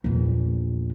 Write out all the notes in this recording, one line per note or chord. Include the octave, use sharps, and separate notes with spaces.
A#1 E2